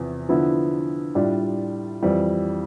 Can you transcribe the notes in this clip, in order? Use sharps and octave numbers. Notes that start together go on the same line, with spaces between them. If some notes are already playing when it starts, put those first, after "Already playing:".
Already playing: E2 C3 F3
D3 F3 B3 E4
A2 G3 D4 F4
F2 E3 G3